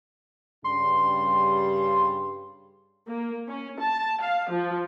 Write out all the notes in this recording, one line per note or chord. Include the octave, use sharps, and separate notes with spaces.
G2 C#3 G3 C6
A#3
C#4
A5
F5
F3